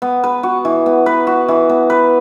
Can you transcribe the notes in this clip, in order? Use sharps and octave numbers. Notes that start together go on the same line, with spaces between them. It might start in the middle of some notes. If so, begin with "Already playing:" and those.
B3
B4
F#4
E3
B3
B4
F#4
E3
B3
B4